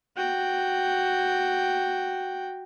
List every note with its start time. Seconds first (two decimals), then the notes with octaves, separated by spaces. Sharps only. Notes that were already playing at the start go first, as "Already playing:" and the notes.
0.16 F#4 G5